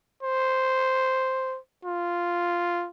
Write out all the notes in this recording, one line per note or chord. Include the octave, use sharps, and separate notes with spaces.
C5
F4